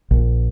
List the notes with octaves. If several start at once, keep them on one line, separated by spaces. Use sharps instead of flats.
A#1